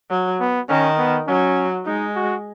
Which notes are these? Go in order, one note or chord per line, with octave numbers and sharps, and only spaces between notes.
F#3
B3
D#3 C#4
B3
F#3 C#4
G#3 D#4
F#4